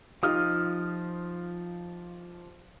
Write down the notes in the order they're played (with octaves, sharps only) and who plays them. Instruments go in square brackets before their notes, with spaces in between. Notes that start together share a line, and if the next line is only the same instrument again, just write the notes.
[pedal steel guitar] F3 D#6 F6 [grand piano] D#4 F4 G4